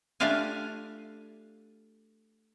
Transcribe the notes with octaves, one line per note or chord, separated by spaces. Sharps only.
A3 D4 F4 G4 F5 G#5